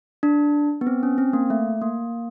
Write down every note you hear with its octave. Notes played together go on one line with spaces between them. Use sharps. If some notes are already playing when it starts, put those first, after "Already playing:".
D4
B3
C4
C#4
C4
A#3
A3
A#3